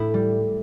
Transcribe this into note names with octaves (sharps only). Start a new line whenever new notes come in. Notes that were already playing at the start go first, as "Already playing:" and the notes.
Already playing: A2 E4
G3